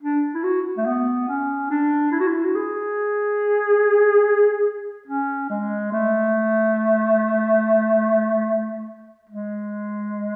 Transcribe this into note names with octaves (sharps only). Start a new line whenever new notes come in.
D4
E4
F#4
A3
B3
C#4
D4
E4
F#4
E4
F#4
G#4
C#4
G#3
A3
G#3